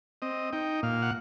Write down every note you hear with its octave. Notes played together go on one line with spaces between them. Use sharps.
C4 D#5
D#4 G5
A#2 F5
F#5